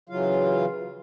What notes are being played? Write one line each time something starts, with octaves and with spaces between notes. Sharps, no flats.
C#3 E3 F#3 F4 F5